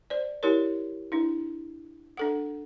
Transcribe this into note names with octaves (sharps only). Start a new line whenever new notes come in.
C5 D5
E4 G4 A#4 C#5
D4 E4
D4 A4 F#5